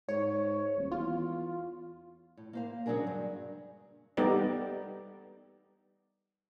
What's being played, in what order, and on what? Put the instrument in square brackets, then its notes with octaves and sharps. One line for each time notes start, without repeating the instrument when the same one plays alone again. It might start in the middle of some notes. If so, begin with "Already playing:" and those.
[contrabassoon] G#2 [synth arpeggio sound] C#5
[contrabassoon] D#1
[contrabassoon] E2 [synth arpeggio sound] F4
[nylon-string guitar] A2
A#3 C5 F5
C#3 F#3 G#3 D4 G#4 A#4
G2
[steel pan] G3 B3 D#4 G4 A4 D5